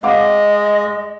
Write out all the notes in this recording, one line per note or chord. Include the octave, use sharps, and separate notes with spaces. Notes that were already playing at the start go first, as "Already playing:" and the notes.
G#3 D#5 F5 F#5 D6